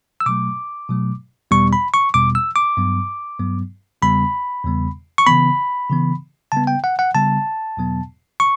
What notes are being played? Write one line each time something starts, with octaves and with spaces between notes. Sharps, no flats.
E6
B2 F#3 A3 D6
B2 F#3 A3
E2 B2 G3 B3 C#6
B5
C#6
E2 B2 G3 B3 D6
E6
D6
G2 F#3 B3
G2 F#3 B3
E2 C#3 G3 B3 B5
E2 C#3 G3 B3
C#6
C#3 E3 B3 B5
C#3 E3 B3
C#3 G3 B3 A5
G5
F#5
F#5
C#3 G3 B3 A5
E2 B2 F#3 B3
C#6